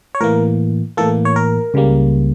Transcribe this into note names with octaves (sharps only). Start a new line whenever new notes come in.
C#5
A2 E3 A#3 A#4
A2 E3 A#3 A4
C#5
A#4
C#2 C#3 G3 A#3